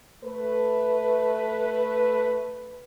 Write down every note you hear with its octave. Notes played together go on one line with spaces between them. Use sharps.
A3 B4